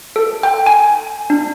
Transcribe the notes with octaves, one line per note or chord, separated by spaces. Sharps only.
A4
G5
G#5
D4